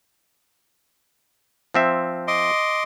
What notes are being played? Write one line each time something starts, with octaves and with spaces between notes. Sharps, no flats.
F3 C4 E5
D#5 C6 D6